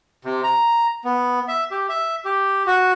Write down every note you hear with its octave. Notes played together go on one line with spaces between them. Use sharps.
C3
A#5
B3
E5
G4
E5
G4
F#4